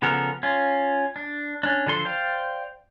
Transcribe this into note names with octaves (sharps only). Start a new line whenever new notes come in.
C#3 F3 B3 A4 A#4
C#4 F4
D4
C#4 D4
D3 F3 A4 C6
C5 D5 F5 G5